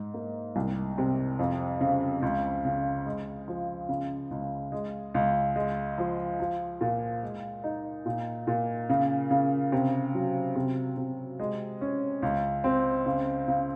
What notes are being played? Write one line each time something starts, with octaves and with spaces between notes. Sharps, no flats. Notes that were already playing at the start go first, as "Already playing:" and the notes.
Already playing: G#2
A#3
C2
C3
F2
C#3
C#2
C#3
G#3
F3
C#3
C#2
G#3
C#2
G#3
F3
F3
A#2
G#3
D#4
A#2
A#2
C#3
C#3
C3
F#3
C3
C3
G#3
C#4
C#2
C4
C#3
C#3